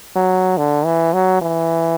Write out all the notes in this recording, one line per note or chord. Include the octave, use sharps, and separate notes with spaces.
F#3
D3
E3
F#3
E3